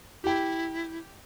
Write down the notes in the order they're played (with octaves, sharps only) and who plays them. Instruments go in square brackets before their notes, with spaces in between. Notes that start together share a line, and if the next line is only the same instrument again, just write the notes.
[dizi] E4 [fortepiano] G4 G5